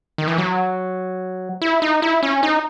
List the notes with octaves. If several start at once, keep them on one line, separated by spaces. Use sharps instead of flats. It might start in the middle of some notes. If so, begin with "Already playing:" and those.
D#3
E3
F#3
E4
D#4
E4
C#4
D#4